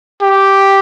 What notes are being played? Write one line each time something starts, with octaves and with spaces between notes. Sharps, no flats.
G4